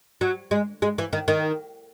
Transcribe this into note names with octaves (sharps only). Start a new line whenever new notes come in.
F#3
G#3
G#3
E3
D#3
D#3